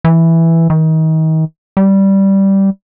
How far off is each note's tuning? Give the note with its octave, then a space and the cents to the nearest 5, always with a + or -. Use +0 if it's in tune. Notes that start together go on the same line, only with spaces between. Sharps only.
E3 +0
D#3 +35
G3 -10